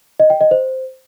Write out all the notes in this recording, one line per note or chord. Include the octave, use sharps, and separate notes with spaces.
D#5
G5
D#5
C5